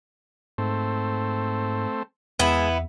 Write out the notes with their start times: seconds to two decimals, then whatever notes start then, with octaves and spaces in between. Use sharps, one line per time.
0.58 G#2 A3 C4
2.39 E2 G#3 B3 E4